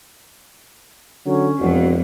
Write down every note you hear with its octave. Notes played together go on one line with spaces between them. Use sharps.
D3 F#3 C#4
E1 F2 F#4